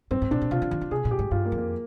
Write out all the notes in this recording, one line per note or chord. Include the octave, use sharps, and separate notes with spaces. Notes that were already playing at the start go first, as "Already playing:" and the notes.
G2 C4
G#2
A#2 D4
A#2
C3 F4
D3
D#3
D#3
C3 G#4
A#2
G4
G#2
G2 F4
A#3
F2
A#3